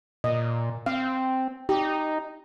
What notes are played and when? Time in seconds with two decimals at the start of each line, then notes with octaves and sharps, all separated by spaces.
0.24 A#2 D#5
0.86 C4 F5
1.69 D#4 G4